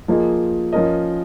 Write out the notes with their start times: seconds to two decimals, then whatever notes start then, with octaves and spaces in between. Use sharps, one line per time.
0.08 F3 A#3 F4 G#4 D#5
0.73 F3 C#4 A#4 D#5